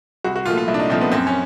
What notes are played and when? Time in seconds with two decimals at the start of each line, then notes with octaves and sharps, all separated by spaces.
0.24 C2 F#4
0.36 F#4
0.46 A#2 F3 A3 F4
0.57 F4
0.68 C2 E4
0.74 D4
0.79 D#4
0.89 A#2 F3 A3 C4
1.01 B3
1.12 F#2 C4
1.27 C#4